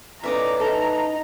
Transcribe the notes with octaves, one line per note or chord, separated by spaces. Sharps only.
A2 E3 C#4 D#4 D5 E5 A#5
D#4 A4